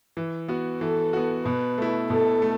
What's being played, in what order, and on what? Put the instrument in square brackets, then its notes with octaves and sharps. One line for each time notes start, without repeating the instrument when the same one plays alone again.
[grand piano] E3
B3 F#4
[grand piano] E3 [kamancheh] A4
[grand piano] B3 F#4
[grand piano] B2 [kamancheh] B4
[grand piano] A3 E4
[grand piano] B2 [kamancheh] A4
[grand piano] A3